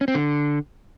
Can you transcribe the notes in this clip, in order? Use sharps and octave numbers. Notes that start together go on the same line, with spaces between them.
C#4
C4
D3